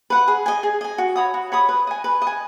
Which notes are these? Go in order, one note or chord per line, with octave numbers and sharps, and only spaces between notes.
B4 F#5
G#4
D#5 G#5
G#4
D#5 G#5
F#4
C#5 B5 D#6
F#4
C#5 B5 D#6
B4
D#5 G#5
B4
D#5
G#5